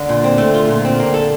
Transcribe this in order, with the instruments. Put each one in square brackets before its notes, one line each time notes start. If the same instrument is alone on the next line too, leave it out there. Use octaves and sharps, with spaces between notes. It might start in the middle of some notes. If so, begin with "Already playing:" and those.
Already playing: [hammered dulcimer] D3
[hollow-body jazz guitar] A#2
C4
A3
F4
A#2
C4
A#3
A4